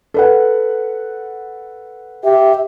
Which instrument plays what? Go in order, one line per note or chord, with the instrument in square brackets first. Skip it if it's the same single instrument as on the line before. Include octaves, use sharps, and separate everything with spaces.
[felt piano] A4 B4 F#5
[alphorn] G4 [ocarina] E5